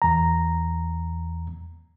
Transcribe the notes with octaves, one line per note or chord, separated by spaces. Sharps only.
E2 A#5